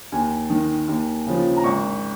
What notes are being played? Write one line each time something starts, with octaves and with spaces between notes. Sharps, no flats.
D#2 G#5
D#3
D#2
C#3 F3
A#5
G#1 C#6